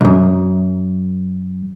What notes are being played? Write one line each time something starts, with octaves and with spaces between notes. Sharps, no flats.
B1 F#2